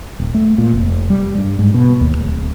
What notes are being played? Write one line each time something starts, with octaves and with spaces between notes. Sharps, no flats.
D#1
A3
A#2
F1
G3
G2
G#2
B2
D#2
D1